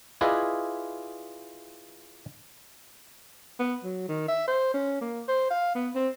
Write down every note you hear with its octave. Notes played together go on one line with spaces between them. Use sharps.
E4 F4 G#4 B4 D5 D#5
B3
F#3
D#3
E5
C5
C#4
A#3
C5
F5
B3
C4